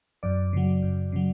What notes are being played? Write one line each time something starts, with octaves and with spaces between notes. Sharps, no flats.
F#2 D5
C#3 F#3
F#2
C#3 F#3